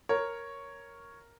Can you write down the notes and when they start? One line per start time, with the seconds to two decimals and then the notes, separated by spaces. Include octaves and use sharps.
0.09 A#4 C#5